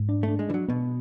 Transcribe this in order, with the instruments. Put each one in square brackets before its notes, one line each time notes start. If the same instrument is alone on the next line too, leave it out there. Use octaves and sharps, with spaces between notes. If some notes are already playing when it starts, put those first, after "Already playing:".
Already playing: [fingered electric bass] G#2
D4
[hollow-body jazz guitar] A3 [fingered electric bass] D4
[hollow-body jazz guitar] G#3
[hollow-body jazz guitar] E3 [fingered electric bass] D4
[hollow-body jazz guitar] F#3
[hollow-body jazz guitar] B2 [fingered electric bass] B3